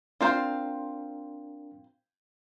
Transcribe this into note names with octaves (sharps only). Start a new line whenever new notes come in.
C4 D4 F4 A#4 C5